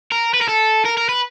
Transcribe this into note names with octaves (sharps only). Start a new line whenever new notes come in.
A#4
B4
A#4
A4
A#4
A#4
B4